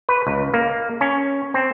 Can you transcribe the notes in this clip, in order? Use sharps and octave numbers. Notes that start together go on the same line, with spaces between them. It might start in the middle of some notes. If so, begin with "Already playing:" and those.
B4
C#2
A#3
C#4
C4